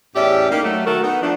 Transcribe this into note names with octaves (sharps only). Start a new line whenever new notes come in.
E2 A2 C#4 G4 D5 E5
G3 A#3 D#4
F#3 A3
D#3 F#3 A3 F#4 A4 A#4
B3 D#4
F3 A3 D4